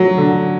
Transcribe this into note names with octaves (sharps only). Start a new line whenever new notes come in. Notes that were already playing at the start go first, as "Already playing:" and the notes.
Already playing: F#3
D3